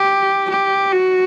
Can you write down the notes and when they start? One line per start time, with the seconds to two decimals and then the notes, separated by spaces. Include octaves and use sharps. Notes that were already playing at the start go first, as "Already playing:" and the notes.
Already playing: G4
0.50 G4
0.92 F#4